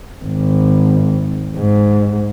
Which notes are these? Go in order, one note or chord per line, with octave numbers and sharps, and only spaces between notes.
G#1
G#2